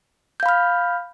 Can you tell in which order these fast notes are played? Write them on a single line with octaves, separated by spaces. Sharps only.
G6 F5 B5 F6